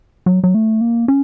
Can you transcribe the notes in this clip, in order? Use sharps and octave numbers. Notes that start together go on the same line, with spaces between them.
F#3
F#3
A3
A#3
C#4